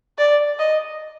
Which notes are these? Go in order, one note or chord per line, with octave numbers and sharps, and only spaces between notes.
D5
D#5